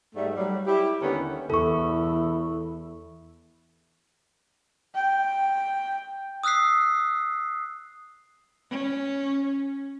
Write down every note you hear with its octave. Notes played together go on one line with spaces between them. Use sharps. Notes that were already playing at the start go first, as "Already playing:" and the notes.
G#2 G3 A3
F#3 G3
E4 G4
D#2 D3 B3 C#4 A#4
E2 E4 A4 C#6
G5
D#6 E6 F#6 B6 C7
C#4